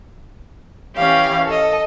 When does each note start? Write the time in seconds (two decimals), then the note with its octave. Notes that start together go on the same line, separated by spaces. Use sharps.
0.97 E3 C#4 G4 F5
1.46 A4 D#5